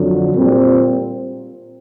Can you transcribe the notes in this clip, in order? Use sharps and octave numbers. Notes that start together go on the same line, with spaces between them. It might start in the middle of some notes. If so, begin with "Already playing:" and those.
Already playing: F2 D3 F#3
A#2 G3 C4